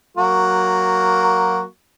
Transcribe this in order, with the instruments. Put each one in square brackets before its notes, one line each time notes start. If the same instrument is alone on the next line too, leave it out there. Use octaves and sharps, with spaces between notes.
[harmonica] F#3 A#3 F#4